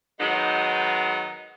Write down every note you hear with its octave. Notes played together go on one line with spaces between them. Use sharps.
D#3 F#3 G#3 B3 D#4